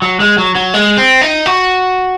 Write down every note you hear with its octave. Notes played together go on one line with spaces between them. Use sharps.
F#3
G#3
F#3
F#3
G#3
C4
D#4
F#4